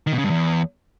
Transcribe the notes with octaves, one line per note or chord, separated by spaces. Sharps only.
D#3
B2
C#3
G2
E2